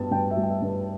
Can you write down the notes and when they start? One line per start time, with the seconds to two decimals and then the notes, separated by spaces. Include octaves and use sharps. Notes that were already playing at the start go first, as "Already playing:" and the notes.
Already playing: G2 G3 B3 A5
0.11 G2 G5
0.31 E5
0.37 G3
0.43 G5
0.49 E5
0.62 G2
0.69 B4